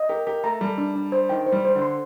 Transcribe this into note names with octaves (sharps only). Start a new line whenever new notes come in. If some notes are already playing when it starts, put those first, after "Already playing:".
Already playing: D#5
G4 A#4
G4 A#4
A3 A#5
G3 A4
D4
D4
C5
D#3 G5
C5
G3
C5
D3
C6